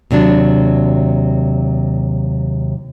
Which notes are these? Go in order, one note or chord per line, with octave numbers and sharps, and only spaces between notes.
D#2 C3 F#3 D4